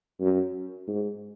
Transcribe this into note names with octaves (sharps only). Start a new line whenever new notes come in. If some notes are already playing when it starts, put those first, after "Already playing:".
F#2
G#2